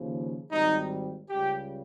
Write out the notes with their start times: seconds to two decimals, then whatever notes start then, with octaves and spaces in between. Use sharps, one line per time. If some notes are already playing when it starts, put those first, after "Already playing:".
Already playing: D#2 C#3 F3
0.51 G#1 G#2 G3 D#4
1.30 C#2 C#3 G3 G4